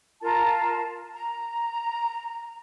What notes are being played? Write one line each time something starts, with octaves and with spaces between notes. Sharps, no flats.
F4 A#4 A5 A#5
A#5